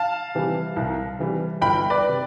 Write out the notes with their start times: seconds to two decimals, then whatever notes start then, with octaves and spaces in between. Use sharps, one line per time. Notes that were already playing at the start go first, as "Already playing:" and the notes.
Already playing: F5 A5
0.35 C3 E3 G3
0.76 C2
1.19 C3 E3 G3
1.61 G1 G5 B5
1.90 B4 D5
2.08 C3